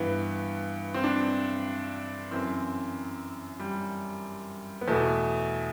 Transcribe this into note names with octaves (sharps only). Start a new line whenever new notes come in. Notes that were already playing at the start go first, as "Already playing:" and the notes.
Already playing: G2 E3 B3
C4
D4
F#2 E3 C4
G3
B3
E2 B2 A3